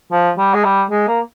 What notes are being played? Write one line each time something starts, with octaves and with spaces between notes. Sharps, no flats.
F3
G3
G#3
G3
G#3
A#3